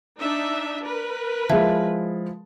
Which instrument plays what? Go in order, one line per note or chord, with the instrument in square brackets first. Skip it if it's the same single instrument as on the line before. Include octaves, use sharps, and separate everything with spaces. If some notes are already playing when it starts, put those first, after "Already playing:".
[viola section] D4 D#4 E5
A#4 B4
[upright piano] F3 G#3 [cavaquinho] E4